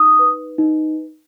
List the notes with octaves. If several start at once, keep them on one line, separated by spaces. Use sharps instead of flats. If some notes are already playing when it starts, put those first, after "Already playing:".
Already playing: D#4 D#6
B4
D#4